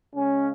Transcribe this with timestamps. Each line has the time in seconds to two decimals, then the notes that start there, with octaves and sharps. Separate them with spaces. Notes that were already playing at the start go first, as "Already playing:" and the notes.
0.15 C#3 G#3 C#4